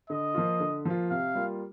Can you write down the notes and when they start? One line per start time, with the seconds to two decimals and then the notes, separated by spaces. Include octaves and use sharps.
0.10 D3 D#5
0.34 F3 A#3 F4
0.60 D3
0.85 F3 A#3 F4
1.10 C3 F5
1.35 G3 A#3 F4